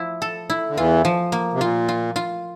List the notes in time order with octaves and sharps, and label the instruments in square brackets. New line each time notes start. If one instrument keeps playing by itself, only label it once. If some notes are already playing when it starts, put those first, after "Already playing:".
Already playing: [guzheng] F3 E4
A4
E4
[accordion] D3
[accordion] E2 E3 [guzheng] F4
[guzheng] F3
A#3
[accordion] C3
[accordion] A#2 [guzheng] F4
[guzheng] F4
F4